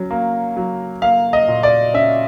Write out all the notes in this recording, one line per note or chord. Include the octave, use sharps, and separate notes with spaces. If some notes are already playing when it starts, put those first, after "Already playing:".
Already playing: F#3 C#4
A#3
F#3
A#3 F5
D#5
A#2
D5
C#4 E5